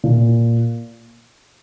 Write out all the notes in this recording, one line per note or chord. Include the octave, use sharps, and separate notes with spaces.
A#2